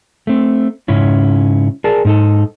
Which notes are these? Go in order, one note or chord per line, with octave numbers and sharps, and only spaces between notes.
A3 C4
G#2 C#3 C#4 E4
G#4 A#4 D5 A5
G#2 D#4 A4